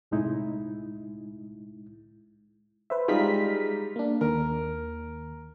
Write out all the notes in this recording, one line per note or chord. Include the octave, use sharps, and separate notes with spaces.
C2 A2 G#3 D#4 E4
B4 C5 E5
G3 G#3 D#4 F4 B6
A#3 D4
D#2 A#4